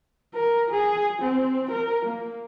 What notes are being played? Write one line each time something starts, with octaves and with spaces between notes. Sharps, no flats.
A#4
G#4
C4
A#4
A#3